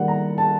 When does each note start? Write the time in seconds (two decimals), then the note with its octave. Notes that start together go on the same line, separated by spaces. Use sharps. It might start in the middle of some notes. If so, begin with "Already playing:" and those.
Already playing: D#3 G3 A#3 F#5
0.08 A#5
0.38 A5